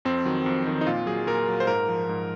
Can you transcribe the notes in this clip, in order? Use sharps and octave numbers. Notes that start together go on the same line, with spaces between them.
F2 C4
D#3 F#3
F2
D#3 F#3
D#4
A#2 F4
F#3 G#4
A#2 A#4
F#3
C5
G#2 A#4
F3
G#2